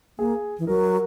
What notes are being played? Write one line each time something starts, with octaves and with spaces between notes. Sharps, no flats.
A#3 G#4
E3
F#3 A#4